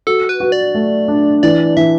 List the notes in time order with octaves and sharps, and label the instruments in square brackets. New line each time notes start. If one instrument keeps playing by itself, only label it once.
[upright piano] F#4 [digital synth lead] A4
[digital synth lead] B4
[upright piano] F#4
[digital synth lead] D5
[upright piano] A3
D4
[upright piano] E3 [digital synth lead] D5
[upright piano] E3 [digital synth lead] E5